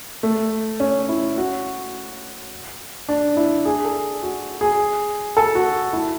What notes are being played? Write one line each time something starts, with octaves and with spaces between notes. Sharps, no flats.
A3
C#4
E4
F#4
D4
E4
G#4
A4
F#4
G#4
A4
F#4
E4